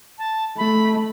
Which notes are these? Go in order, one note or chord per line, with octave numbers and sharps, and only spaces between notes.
A5
A3 B5